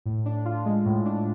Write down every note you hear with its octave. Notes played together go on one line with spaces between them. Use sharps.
A2
D4
F4
G#3
A2
D4